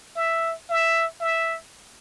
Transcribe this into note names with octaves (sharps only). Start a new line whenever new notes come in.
E5
E5
E5